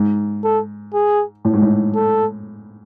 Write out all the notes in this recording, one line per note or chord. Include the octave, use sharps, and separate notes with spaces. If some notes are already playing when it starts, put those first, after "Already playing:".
Already playing: G#2
A4
G#4
A2
G#2
A2
A4